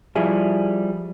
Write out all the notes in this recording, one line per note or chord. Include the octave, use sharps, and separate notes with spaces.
F3 G3 E4 G#4